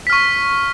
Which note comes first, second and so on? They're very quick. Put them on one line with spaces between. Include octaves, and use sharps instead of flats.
B6 F6 C#6